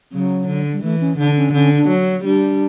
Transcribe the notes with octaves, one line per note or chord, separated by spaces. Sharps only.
C#3 F#3
D3
G3
E3 A3
C#4
D3 D4
C#4
D3 C#4
D4
F#3
G3 D4